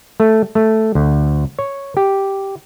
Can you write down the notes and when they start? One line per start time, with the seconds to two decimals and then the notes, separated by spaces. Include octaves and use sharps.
0.20 A3
0.55 A3
0.95 D2
1.59 C#5
1.97 G4